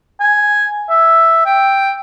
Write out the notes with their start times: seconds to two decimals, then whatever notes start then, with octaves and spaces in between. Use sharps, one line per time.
0.20 G#5
0.90 E5
1.46 G5